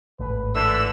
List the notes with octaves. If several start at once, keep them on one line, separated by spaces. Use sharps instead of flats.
G#1 A2 B4
D3 E3 A4 E6